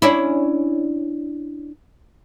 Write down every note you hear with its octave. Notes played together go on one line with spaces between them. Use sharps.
C#4 D4 E4